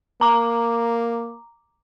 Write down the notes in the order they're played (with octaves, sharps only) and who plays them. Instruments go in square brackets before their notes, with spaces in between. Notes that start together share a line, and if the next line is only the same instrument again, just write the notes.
[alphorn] A#3 [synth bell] A#5 D6